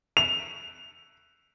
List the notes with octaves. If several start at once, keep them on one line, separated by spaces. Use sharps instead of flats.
F7